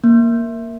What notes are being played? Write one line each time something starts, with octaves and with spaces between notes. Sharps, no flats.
A#3